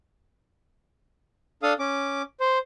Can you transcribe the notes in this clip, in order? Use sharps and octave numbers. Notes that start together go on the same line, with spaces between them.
D4 A4 F5 D#6
C#4 D6
C5